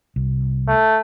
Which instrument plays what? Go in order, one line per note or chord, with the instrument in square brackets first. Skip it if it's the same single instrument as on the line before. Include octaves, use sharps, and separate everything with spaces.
[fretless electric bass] C2
[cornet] A3